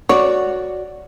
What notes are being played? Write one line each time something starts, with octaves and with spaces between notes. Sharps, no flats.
F#4 C#5 D5